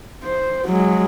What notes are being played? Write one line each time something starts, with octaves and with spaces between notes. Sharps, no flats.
C5
F#3 G#3